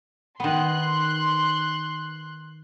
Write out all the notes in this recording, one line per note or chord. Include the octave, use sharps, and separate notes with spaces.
D#3 B3 C6 F#6